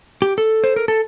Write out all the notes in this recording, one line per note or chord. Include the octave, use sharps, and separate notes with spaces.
G4
A4
C5
A#4
A4